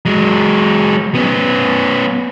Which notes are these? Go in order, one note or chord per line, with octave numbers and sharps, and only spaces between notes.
F#3 G#3
B3 C#4